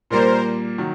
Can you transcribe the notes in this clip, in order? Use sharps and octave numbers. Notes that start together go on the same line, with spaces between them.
A#2 G3 A#3 A#4 C5
D#3 F#3